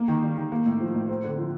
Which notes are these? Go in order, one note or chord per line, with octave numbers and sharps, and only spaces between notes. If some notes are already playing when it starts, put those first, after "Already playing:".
Already playing: A#3
D#3
G3
D#3
A#3
A2
F3
A2
C4
D3
F3